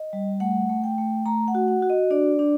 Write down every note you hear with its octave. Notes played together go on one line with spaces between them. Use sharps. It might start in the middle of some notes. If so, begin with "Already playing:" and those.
Already playing: D#5
G3
A3 F#5
A3
G5
A3
A3 A#5
F#5
F#4
F#5
F#4
D#5
D4 D5
D4